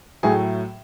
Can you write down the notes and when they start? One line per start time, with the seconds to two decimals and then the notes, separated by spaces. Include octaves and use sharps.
0.23 A2 F#3 A3 G#4